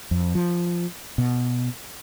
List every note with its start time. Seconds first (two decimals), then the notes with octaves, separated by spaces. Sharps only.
0.11 F2
0.35 F3
1.18 B2